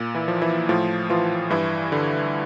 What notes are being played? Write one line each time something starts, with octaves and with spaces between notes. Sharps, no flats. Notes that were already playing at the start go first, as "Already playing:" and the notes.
Already playing: A#2
E3 E4
F3
E3 E4
A2 F3 F4
E3 F3 F4
G2 E3 E4
D3